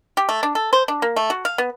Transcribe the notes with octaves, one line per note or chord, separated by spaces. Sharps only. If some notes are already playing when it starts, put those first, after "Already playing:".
G4
A3
D4
A4
C5
D4
A#3
A3
F#4
F5
B3